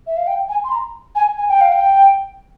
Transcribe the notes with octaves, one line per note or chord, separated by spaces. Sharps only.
E5
F5
G5
G#5
C6
A#5
G#5
G#5
G5
F5
G5